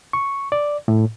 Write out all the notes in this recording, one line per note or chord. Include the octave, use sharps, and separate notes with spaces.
C#6
D5
A2